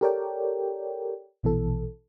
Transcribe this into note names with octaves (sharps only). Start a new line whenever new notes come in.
G4 A4 A#4 C#5 D5 G5
A#1 B2 E3 A4